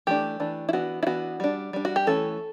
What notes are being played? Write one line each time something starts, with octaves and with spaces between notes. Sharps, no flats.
E3 A3 D4 G4
E3 A3 D4
E4
E3 B3 D4 F#4
E4
E3 B3 D4 F#4
G3 D4
G3 D4
F#4
G4
E3 A3 C#4 A4